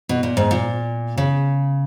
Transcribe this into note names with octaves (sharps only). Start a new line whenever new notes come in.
B2
A#2
G#2
A#2
C#3